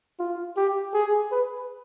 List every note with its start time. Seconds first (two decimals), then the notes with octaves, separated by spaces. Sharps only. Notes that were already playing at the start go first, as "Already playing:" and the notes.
0.19 F4
0.57 G4
0.94 G#4
1.31 B4